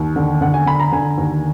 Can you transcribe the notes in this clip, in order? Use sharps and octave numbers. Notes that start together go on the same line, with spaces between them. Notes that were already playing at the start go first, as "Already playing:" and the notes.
Already playing: D#2
D3
D3 F#5
G#5
D3 B5
A#5
D3 G#5
D#2